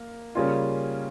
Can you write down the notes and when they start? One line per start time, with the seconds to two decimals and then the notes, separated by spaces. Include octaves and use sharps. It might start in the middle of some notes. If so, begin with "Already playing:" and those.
Already playing: A#3
0.35 C#3 G3 A#3 C#4 F4